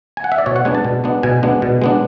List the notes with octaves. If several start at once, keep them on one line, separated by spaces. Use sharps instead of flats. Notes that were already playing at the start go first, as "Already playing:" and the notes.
G#5
F#5
E5
D5
B2 C#5
F#5
G#3 B3 D4 G#5
A5
B2
G#3 B3 D4
B2 G#5
G#3 B3 D4
B2
G#3 B3 D4